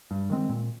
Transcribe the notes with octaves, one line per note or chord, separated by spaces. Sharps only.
G2
D#3 G#3 C4
A#2